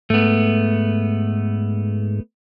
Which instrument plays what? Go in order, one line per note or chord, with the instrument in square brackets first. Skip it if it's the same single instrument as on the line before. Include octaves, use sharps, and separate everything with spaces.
[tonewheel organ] G#2 [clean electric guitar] A3 B3